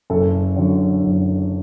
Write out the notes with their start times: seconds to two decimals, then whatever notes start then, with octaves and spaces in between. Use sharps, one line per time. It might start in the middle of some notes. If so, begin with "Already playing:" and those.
0.10 F#1 A4
0.56 F#2 D3 F#3
1.03 F#1